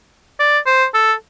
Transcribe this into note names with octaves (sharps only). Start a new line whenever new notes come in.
D5
C5
A4